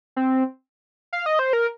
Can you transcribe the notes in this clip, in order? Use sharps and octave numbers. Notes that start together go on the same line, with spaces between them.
C4
F5
D#5
C5
A#4